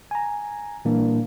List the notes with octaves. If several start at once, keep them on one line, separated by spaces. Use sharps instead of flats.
G#5 A#5
A#2 E3 G3 A#3 D4